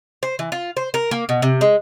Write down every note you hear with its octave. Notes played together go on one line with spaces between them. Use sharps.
C5
E3
F4
C5
A#4
A#3
B2
C3
G#3